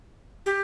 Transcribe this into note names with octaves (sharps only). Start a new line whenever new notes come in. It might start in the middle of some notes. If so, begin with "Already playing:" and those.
G4